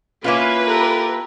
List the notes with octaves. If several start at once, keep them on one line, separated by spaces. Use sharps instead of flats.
A#3 C#4 E4 F4 B4
G4 A4 A#4